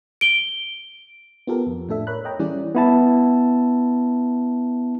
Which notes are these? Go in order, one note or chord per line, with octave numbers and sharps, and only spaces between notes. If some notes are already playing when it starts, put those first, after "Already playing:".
D7 G7
B3 F4 G4 A4 A#4
F2
A2 D4 A4 E5
A#4 C#5 B5 F#6
C#5 D#5 G5 A#5
E3 G3 C#4 E4 G#4 D5
B3 E4 A5